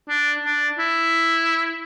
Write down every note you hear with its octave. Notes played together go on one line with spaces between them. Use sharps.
D4
D4
E4